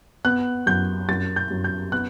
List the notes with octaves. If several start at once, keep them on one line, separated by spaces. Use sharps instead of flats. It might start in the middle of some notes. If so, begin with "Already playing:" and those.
B3 F#6
F#2 G6
F#2 A6
G6
F#2
G6
B3 F#6